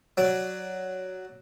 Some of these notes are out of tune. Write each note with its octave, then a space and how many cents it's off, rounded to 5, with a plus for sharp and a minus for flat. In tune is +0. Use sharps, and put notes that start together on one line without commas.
F#3 +5 D5 +0